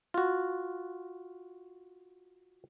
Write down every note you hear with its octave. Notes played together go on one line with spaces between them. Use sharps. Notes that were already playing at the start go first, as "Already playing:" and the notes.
F4 F#4